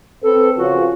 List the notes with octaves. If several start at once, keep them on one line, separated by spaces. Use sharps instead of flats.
C4 A4 B4
C#3 F3 F4 F#4